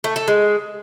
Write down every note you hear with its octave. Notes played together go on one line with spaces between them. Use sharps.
A3
A4
G#3